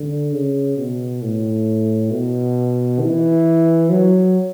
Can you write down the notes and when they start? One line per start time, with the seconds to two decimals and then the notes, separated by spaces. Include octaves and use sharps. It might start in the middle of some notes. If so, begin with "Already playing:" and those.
Already playing: D3
0.33 C#3
0.77 B2
1.22 A2
2.11 B2
3.01 E3
3.90 F#3